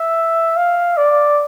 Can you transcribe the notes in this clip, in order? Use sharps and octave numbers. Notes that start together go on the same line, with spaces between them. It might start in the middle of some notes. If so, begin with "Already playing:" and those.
Already playing: E5
F5
D5